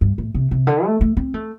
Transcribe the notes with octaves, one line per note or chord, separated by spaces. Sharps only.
G2
A2
C3
C3
D3
A3
A3
C4
A3